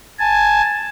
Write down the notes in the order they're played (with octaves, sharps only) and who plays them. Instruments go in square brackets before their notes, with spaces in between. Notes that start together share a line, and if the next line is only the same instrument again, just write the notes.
[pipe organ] G#5 A5